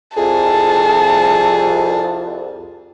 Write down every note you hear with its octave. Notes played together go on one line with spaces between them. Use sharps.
C2 F2 G#4 A5